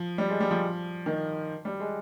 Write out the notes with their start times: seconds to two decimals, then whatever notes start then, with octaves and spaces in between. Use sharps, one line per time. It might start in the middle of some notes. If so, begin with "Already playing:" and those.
Already playing: F3
0.18 G3
0.30 G#3
0.40 G3
0.51 F3
1.06 D#3
1.65 G3
1.80 G#3